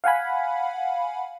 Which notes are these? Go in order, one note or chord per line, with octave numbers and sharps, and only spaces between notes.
F5 F#5 G#5 B5